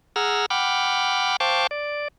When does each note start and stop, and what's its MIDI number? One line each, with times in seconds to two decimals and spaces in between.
0.16 0.46 68
0.16 0.46 78
0.16 0.46 82
0.16 0.46 88
0.16 0.46 89
0.50 1.36 78
0.50 1.36 79
0.50 1.36 83
0.50 1.36 86
0.50 1.36 89
1.40 1.67 72
1.40 1.67 77
1.40 1.67 79
1.40 1.67 81
1.40 1.67 85
1.40 1.67 86
1.71 2.08 74